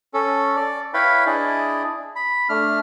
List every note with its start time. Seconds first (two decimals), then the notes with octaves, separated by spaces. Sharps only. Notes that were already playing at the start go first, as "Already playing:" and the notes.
0.14 C#4 A4
0.56 D5
0.94 E4 B4 C#5 F5 G5 B5
1.26 D4 E4 G#4 D5 D#5
2.16 B5
2.49 A3 D4 F6